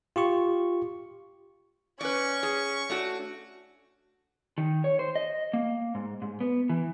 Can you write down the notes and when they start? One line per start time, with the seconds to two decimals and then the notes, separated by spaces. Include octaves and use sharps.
0.16 F4 G4 C#6
2.01 C#4 B4 D5 C#6
2.43 G#4
2.89 A3 D4 F#4
4.58 D#3
4.84 C#5
4.99 C5
5.15 D#5
5.53 A#3
5.95 G#2
6.22 G#2
6.41 B3
6.69 E3